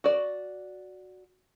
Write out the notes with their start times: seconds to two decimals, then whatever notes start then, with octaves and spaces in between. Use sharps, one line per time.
0.04 F#4 D5